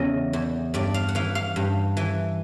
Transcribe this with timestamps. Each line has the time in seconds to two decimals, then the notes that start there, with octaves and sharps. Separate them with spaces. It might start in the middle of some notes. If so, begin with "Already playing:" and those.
Already playing: E2 C#3 D#5
0.33 E2
0.74 G2 D5
0.94 F5
1.08 F#5
1.15 E3 F5
1.35 F5
1.56 G2
1.97 E3